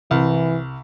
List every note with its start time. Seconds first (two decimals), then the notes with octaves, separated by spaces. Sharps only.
0.11 C2 E3